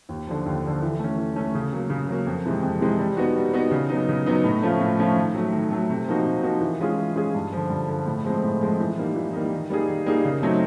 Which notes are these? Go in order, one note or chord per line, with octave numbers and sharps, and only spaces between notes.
D#2
D3 F3
D#2
D3 F3
E3
A3 C#4
E3
A3 C#4
C#3
F#3 A#3
C#3
F#3 A#3
F2
C3 E3 G#3
F2
C3 E3 G#3
G3
B3 D#4 F#4
G3
B3 D#4 F#4
C#3
F#3 B3 D#4
C#3
F#3 B3 D#4
A2
F3 A3 C#4 F4
A2
F3 A3 C#4 F4
D#3
F#3 A3
D#3
F#3 A3
C3
F3 A#3 D#4 F#4
C3
F3 A#3 D#4 F#4
E3
G#3 C#4 F4 G#4
E3
G#3 C#4 F4 G#4
G2
D3 F3
G2
D3 F3
A2
F3 G#3 C4
A2
F3 G#3 C4
E3
G3 A#3 D#4
E3
G3 A#3 D#4
D#3
G3 A#3 D#4 G#4
D#3
G3 A#3 D#4 G#4
C#3
F#3 A3 C4 D#4